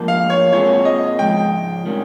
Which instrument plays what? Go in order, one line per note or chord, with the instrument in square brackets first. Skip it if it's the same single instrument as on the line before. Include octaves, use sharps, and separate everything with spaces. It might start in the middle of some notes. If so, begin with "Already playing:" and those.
Already playing: [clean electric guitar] G#2 F3 A#3 F4
[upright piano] F5
C#5
[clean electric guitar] A#2 G#3 C4 F4 G#4 [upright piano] C#5
[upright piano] D#5
[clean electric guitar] G#2 F3 G#3 [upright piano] G5
[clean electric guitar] C3 D#3 G3 C#4